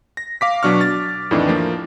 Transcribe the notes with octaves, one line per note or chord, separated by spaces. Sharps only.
A#6
F5 D6 B6
B2 F#3 D4 C#6 F6
A6
F2 A2 D#3 E3 D4 D#4
F3 A3 A#3